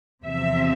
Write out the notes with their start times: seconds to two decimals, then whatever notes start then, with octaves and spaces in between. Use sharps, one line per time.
0.24 E2 C3 F3 C4 E5